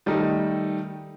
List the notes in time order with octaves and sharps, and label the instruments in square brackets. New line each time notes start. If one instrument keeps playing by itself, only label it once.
[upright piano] D#3 G3 A3 D#4